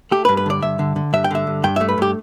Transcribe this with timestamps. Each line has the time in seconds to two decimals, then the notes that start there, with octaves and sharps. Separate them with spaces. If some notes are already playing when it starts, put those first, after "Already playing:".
0.11 A3 G4
0.25 B4
0.29 G2
0.37 B4
0.46 D3 D5
0.63 G2 E5
0.79 D3
0.96 D3
1.13 G2 E5
1.24 G5
1.31 D3 E5
1.47 G2
1.64 G2 G5
1.76 A3 E5
1.89 B4
1.98 G2 G4